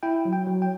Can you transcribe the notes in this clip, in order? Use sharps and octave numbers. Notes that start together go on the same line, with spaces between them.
E4 G5
F#3
G5
F#3
G5